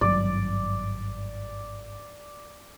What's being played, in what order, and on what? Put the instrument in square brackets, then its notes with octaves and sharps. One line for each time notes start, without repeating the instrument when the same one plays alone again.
[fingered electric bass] G#1 G2 F#3 [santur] D5